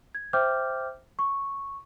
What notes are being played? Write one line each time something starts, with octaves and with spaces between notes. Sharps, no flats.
G#6
C5 E5 G5 D6 F6 G6
C#6